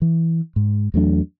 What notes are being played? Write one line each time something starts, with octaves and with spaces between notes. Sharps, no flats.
E3
G#2
E2 F#3 A3 D4